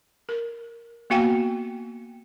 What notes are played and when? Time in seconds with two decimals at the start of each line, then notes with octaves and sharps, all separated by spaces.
0.29 A#4
1.10 A#3 B3 F#4 F5 G5 G#5